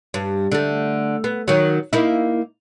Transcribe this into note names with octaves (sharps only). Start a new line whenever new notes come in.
G2
D3 A3
B3
D#3 F#3
A#3 D#4 E4